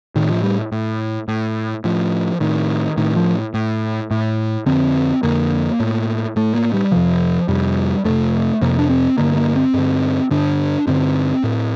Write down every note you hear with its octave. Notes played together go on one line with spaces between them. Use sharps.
A2 D#3
F3
G3
A2
A2
A2 F3
A2 D#3
A2 D#3
F3
A2
A2
F2 D3 C4
F2 D3 A#3
A2
A2 A3
A#3
G3
F2 C3 F3
F2 C3 G3
F2 C3 A3
F2 C3 A#3
D4
C4
G2 D3 A#3
A#3
C4
G2 D3
G2 D3 D4
G2 D3 C4
A2